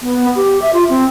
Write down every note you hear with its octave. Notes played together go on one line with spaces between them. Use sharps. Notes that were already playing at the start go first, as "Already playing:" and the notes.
B3
G4
E5
F4
C4